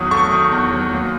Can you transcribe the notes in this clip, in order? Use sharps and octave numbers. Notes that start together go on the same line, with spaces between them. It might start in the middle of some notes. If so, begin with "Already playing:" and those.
Already playing: E2 D#3 F#3 C#6 D#6
A3 C#6
D#3
E2
F#3
D#2